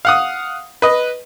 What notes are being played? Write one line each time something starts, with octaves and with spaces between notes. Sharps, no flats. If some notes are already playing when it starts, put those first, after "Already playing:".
F5 F#5 D#6
B4 D#5